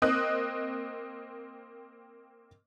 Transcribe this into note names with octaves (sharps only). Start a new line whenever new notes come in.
A#3 C4 D#5 D#6 F#6